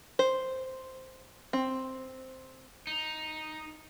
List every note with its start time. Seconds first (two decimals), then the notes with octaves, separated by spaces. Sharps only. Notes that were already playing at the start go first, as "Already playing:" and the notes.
0.19 C5
1.53 C4
2.87 D#4